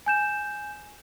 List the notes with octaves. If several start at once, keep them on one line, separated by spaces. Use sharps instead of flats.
G#5 G6 E7